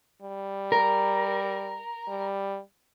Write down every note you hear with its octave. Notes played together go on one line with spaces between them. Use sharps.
G3
A#4
G3